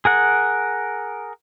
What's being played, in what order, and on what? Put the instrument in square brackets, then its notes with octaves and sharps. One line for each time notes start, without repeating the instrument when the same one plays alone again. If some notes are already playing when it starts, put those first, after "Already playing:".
[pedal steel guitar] G#4 A#4 F#5